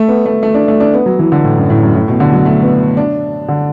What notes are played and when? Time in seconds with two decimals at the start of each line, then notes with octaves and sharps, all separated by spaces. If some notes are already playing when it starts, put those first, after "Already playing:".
Already playing: A3
0.08 B3
0.26 A3
0.43 A3
0.54 D4
0.68 A3
0.80 D4
0.94 B3
1.06 F#3
1.19 E3
1.32 D3
1.44 A2
1.57 F#2
1.70 A2
1.83 F#2
1.95 A2
2.08 B2
2.20 D3
2.33 F#3
2.45 A3
2.63 B3
2.97 D4
3.48 D3